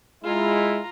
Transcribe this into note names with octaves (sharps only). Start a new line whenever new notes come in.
G#3 E4 F4 A#5